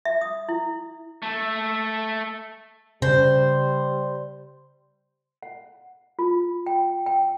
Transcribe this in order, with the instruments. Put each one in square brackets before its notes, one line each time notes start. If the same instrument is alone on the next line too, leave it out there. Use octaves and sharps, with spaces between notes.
[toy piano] E5
D#6
E4
[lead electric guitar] A3 A4
[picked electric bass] C#3 [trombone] G3 [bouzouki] C5
[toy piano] F#5
F4
G5
G5